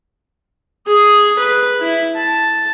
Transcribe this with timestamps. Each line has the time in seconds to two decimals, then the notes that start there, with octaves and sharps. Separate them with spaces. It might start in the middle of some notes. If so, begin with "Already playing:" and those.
0.87 G#4 D#6
1.38 B4
1.80 E4
2.16 A5